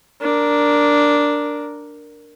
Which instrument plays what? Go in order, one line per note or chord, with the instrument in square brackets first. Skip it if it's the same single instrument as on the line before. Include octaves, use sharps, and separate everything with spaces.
[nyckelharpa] D4 A#4